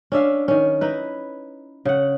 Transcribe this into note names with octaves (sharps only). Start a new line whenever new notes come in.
C#4 D4 E5 F5
D#3 C#4
D#4 E4 B4
C#3 F#5